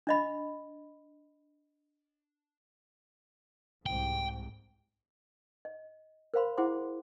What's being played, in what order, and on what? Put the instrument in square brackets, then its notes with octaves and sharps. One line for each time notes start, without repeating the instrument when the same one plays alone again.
[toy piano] D4 D#5 B5
[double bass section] C2 G#2 [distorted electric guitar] G5
[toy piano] D#5
A#4 C5 F5 B5 C6
E4 G#4 C5 F#5 C6 D6